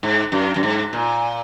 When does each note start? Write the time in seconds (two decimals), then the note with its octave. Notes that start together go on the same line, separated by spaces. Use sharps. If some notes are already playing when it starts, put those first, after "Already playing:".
0.03 G#2
0.32 F#2
0.56 F#2
0.63 G#2
0.93 A#2